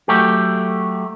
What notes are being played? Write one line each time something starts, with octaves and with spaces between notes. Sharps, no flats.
F#3 A3 G4